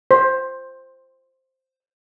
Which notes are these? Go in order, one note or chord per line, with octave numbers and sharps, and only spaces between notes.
C5